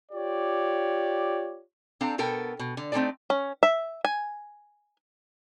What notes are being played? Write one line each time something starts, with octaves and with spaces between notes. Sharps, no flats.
F4 G4 C#5 D5
C4 D4 A4 F5 A#5
B2 B3 A4 A#4 G5
B2
D3
A3 C4 C#4 D#4 A4 D5
C#4
E5
G#5